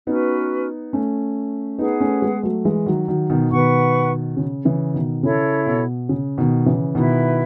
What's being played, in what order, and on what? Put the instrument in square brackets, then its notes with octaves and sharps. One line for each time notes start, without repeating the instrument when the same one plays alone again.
[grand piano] B3 D#4 [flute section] C#4 F#4 B4
[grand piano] A3 C#4
[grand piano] B3 D#4 [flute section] G#4 B4 F#5
[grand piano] A3 C#4
G#3 B3
F#3 A3
E3 G#3
D#3 F#3
D#3 F#3
B2 D#3
[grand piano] B2 D#3 [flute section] B4 F#5 C#6
[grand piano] C#3
C#3 E3
B2 D#3
[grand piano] C#3 [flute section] E4 A4 C#5
[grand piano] B2
C#3
B2 D#3
C#3 E3
[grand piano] B2 D#3 [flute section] E4 B4 E5